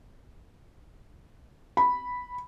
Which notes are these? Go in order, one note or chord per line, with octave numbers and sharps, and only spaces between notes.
B5